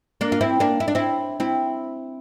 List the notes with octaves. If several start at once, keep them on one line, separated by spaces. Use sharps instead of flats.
A#3 D4
F4
C4 E4
A#3 D4
E4
D4
C4 E4
C4 E4